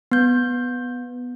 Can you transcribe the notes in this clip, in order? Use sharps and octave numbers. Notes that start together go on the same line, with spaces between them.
B3 G6